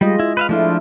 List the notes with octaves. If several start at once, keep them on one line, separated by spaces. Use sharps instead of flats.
G3 G#3 F4 D#5
E4
B4 E5 F5
F3 A3 D4 E4 F4